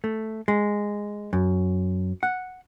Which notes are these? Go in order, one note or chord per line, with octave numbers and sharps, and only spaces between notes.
A3
G#3
F#2
F#5